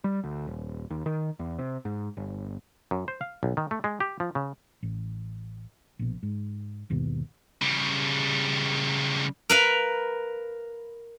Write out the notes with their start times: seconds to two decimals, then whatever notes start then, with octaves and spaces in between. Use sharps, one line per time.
0.04 G3
0.24 D2
0.47 D#1
0.90 D#2
1.06 D#3
1.39 E2
1.59 C3
1.85 G#2
2.17 G1
2.91 F#2
3.08 C5
3.21 F5
3.43 B1
3.57 D#3
3.71 A3
3.84 G#3
4.00 G4
4.20 F3
4.35 C#3
4.83 A1
5.99 A#1 B2
6.23 G#2
6.90 G1 D#2 B2
7.62 C#3 G3
9.49 A#4 B4 F5